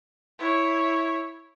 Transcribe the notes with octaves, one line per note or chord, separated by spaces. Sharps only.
E4 C#5